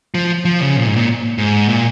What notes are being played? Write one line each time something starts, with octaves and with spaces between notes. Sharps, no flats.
F3
F3
C#3
A#2
G#2
A#2
G#2
A#2